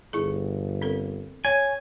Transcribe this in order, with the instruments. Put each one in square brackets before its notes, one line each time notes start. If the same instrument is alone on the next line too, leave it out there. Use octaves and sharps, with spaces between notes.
[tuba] G1 [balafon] E4 G#4
[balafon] C4 A4 A#4
[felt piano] C#5 [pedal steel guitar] G#5